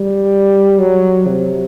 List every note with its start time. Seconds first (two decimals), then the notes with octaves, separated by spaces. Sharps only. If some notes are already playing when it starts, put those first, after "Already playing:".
Already playing: G3
0.79 F#3
1.28 C3